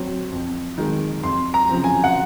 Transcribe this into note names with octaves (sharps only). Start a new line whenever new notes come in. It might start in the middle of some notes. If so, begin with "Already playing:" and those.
Already playing: F#3 C4
F2
D#3 G#3
F2 C6
A#5
C#3 F3 C4
G#5
F#5